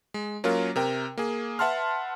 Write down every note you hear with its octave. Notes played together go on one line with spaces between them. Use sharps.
G#3
F#3 A#3 C#4 F4 A#4
C3 A#4 G5
A#3 G#4
B4 E5 F#5 A5 C6 F6